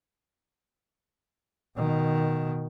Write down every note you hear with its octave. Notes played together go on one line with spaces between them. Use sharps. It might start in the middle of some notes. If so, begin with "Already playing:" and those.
B2 D#3